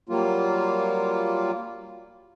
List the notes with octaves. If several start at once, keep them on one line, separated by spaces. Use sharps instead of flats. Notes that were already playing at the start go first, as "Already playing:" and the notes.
F#3 G3 A#3 F4